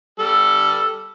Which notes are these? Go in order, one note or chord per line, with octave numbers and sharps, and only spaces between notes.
G3 A4